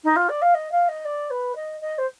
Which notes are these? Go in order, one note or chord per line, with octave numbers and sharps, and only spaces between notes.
D#4
F4
D5
F5
D#5
F5
D#5
D5
B4
D#5
D#5
C5